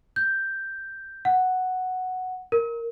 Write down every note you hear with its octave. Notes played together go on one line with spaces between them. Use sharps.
G6
F#5
A#4